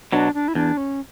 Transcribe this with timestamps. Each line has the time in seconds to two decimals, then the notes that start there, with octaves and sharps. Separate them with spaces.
0.12 B2 F#3 D4
0.35 D4
0.48 E4
0.55 E2 D4
0.77 C#4